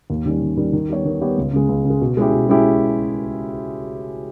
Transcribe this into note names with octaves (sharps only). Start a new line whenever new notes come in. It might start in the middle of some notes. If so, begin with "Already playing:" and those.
D#2
D#3 G3 C#4
D#2
D#3 G3 C#4
D#3
G3 B3 G4 C#5
D#3
G3 B3 G4 C#5
C#2
C#3 G#3
C#2
C#3
G#3
B2
G#3 C#4 E4 G4
B2
G#3 C#4 E4 G4